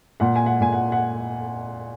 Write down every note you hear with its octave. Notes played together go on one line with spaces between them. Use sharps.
A#2 F#5
G#5
F#5
A#2 G#5
F#5
F#5